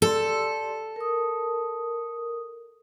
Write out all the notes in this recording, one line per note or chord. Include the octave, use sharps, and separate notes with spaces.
G4 A4 D5 C6
A#4 D#6